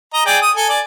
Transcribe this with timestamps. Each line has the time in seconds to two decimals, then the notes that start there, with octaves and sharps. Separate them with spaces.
0.14 D#5 A#5
0.26 G#4 D5 G5
0.42 D#6
0.56 A4 G#5
0.69 D5 G#5